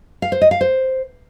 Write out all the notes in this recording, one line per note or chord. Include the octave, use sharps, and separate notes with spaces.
F5
C5
D#5
F5
C5